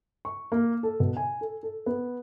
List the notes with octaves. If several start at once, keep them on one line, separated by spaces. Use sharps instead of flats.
C#6
A#3
A4
B2
G#5
A4
A4
B3